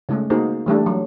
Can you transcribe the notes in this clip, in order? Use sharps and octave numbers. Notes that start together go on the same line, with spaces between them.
C#3 G#3 A3
A#3 D#4 F#4 G#4 C5
E3 G3 A3 D4
F#3